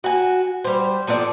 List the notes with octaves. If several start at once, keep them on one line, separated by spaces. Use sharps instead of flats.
F#4 G#5
G3 C5
F3 B3 A4 D5